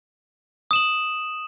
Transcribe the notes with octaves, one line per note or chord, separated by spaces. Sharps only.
D#6 E7 F#7